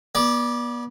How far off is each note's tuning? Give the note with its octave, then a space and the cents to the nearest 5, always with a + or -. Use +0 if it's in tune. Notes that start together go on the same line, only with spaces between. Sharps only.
B3 -35 D5 +0